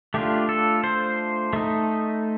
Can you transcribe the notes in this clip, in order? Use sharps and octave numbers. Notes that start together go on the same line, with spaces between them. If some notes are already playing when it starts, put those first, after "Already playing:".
A3 D4 F4 G4
A4
C5
A3 D#4